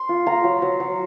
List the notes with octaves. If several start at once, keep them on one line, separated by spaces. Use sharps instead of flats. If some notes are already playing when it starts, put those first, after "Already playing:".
Already playing: C6
F4
F4 A#5
F#3
F#3
F#3